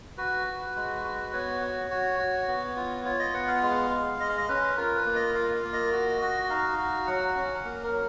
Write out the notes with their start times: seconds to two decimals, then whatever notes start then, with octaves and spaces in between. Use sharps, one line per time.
0.18 F#4 B4
0.47 F#4
0.76 G#3
1.04 F#4
1.33 B3 C#5
1.61 F#4
1.91 F#4
2.19 F#4
2.48 B3
2.76 F4
3.05 F4 C#5
3.19 D#5
3.33 B3 F#5
3.48 F5
3.63 G#3
3.91 G#3
4.20 G#3 D#5
4.29 F5
4.37 D#5
4.49 C#4 B4
4.77 F4 A#4
4.96 B4
5.06 A#3
5.15 D#5
5.34 F4 F5
5.54 F5
5.64 A#3
5.73 D#5
5.92 F#4
6.21 F#4
6.50 D#4 F5
6.78 F#4
7.07 F#3 F#5
7.35 C#4
7.64 A#3
7.84 A#4
7.92 F#3